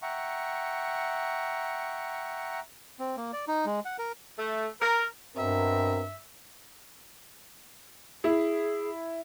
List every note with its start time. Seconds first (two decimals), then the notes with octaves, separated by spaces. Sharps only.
0.02 E5 F#5 G5 A#5 C#6
2.99 C4
3.17 A#3
3.33 D5
3.48 D#4
3.66 G#3
3.85 F#5
3.99 A#4
4.38 A3
4.81 A#4
5.36 G2 B2 C4 A#4 E5
8.24 E4 G#4